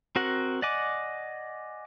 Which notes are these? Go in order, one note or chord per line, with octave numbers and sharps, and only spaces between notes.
C4 F#4 A#4 F#5
D5 D#5 F#5 G#5 D6